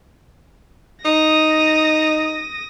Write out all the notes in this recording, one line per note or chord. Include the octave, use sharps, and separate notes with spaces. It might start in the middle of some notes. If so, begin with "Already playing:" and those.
D#4 D#6 A#6